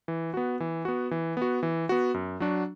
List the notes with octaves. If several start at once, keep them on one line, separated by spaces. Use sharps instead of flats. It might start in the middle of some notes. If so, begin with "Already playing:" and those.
E3
B3 F#4
E3
B3 F#4
E3
B3 F#4
E3
B3 F#4
F#2
F#3 D4 F#4